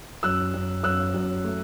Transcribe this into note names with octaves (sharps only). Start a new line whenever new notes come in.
F#2 E6 F#6
F#2
F#2 E6 F#6
F#2
A3